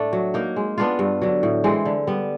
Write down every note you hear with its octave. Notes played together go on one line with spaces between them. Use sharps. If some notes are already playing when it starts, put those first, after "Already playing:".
Already playing: A2 A3 D4
F#3
A#3 D#4
G#3
B3 D4 F4
G2
D3 F#3
A2
E3 G#3 C4
D3
G3 B3